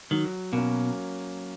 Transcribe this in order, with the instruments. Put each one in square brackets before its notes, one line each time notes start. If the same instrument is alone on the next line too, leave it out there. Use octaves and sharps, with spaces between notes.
[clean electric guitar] D#3 [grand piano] F#3
[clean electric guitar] B2 [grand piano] A#3 C#4